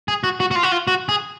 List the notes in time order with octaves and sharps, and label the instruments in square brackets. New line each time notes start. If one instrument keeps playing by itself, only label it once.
[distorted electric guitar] G#4
F#4
F#4
F#4
F4
F#4
F4
F#4
G#4